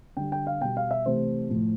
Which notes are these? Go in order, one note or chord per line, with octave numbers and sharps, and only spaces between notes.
D3 G3 G5
G5
F5
B2 G3 G5
F5
E5
C3 E3 A3 C5
A2 F3 A3